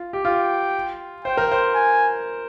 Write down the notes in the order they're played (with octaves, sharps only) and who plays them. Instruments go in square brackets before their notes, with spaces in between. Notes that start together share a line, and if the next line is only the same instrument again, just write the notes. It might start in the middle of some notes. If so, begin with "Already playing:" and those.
Already playing: [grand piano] F4
G4
[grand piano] F4 [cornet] G5
[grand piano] C5 [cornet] G5
[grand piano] A#4
C5
[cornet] G#5